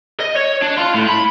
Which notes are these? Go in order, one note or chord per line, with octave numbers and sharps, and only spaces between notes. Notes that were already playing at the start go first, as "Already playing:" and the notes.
D#5
C#5
D4
F5 C6
A2
B5